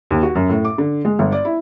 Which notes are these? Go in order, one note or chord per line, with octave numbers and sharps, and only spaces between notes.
D#2
F#4
F#2
A2
D6
D3
G#3
G1
D5
E4